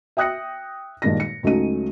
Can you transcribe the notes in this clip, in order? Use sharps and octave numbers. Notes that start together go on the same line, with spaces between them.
E5 G5 D#6 F#6 A#6 C#7
G2 A#2 D#3 G#3 G#4 A#6
C#7
C#2 F#3 A3 C#4 D#4 D#7